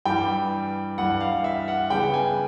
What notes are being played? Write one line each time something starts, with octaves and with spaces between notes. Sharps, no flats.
G2 E3 G3 G5
G2 E3 G3 F#5
F5
E5
F#5
C#3 E3 G3 B3 G5
G#5